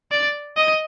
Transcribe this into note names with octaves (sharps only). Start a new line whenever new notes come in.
D5
D#5